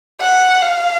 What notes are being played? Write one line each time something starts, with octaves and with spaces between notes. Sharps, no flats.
F#5
F5